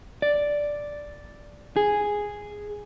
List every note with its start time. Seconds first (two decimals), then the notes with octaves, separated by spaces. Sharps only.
0.22 D5
1.76 G#4